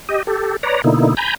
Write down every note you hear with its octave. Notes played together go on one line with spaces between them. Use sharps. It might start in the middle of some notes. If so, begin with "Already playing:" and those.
G4 D#5
G4 A4
B4 C#5 D5 A#5
B2 D3 A#3 D#4 E4
G#5 A#5 B5 G6